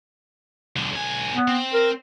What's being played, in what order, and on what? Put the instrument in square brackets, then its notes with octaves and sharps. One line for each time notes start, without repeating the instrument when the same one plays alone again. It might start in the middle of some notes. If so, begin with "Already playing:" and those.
[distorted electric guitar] B1 D3
B1 G#5
[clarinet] B3
[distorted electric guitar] C4
[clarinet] A#4